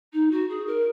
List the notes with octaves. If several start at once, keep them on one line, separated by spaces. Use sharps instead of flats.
D#4
F#4
G#4
A#4